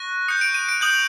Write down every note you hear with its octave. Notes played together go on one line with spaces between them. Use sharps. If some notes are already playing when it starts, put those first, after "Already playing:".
Already playing: C#6 F#6 A#6
D#6 G6 C#7
D7
D#7
D7
D#6 G6 F#7